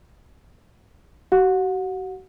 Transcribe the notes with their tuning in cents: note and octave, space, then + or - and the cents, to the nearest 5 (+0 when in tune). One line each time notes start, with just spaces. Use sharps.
F#4 +40 F#5 -30